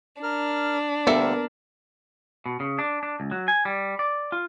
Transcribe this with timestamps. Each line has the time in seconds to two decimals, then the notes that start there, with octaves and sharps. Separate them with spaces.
0.23 D4 A#4 F6
1.07 D2 D3 G3 A#3 B3 A4 A#4 E5
2.46 B2
2.60 C#3
2.79 D4
3.03 D4
3.20 C#2
3.31 F#3
3.48 G#5
3.65 G3
3.99 D5
4.32 F4